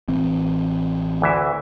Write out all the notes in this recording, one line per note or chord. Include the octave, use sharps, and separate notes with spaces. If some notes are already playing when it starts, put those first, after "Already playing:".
A1 E3 C4
D2 E3 E5